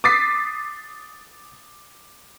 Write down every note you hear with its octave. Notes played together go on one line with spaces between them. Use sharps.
D6 D#6 A6 B6 C7